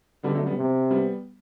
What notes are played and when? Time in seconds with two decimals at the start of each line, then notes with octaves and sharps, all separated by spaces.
0.23 D3 G3 B3
0.35 F#3 A3
0.46 G3 B3
0.57 C3
0.90 G3 B3